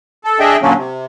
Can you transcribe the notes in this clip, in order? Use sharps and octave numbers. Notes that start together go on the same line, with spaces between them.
A4
D4 G#4 D#5 E5 G5
A#2 D3 F#3 A#3 C#4 D4
C3